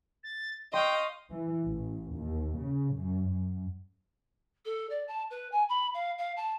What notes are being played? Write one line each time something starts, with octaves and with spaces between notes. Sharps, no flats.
A6
D#5 F5 G5 C6 C#6
E3
A1
D#2
C#3
F#2
F#2
A4
D5
A5
B4
G#5
B5
F5
F5
A5